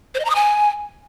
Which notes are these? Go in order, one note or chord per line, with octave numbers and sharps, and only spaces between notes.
C5
D#5
A#5
D#6
G#5